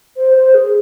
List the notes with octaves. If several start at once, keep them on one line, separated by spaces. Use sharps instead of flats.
C5
C5
G#4